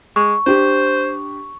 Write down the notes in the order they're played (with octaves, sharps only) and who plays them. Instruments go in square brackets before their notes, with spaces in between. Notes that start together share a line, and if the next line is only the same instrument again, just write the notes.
[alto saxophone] G#3 [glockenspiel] C#6
[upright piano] D4 G4 [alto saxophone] C5